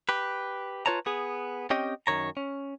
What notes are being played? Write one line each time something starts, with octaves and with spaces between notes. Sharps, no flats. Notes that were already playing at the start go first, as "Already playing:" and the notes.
G4 B4
F4 B4 C#5 A5 A#5
B3 G#4
C4 C#4 G4 D#5 G5
F#2 D#3 C#5 A#5
C#4